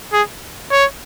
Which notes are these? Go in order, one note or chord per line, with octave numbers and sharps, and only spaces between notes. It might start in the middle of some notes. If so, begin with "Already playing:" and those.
G#4
C#5